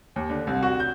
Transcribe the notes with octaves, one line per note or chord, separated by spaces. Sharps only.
D#2
D3
C2
F#4
G6